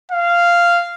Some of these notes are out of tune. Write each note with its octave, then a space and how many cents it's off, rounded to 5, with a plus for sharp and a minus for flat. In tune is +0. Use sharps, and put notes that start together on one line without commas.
F5 -10